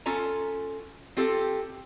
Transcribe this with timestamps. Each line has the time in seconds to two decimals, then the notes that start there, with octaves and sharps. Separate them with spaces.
0.06 C#4 F4 A4 A#5
1.17 C4 F4 G4 A4